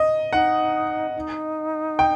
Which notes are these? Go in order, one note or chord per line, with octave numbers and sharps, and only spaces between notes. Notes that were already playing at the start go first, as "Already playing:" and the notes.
Already playing: D#5
D#4 F#5
D#4
G5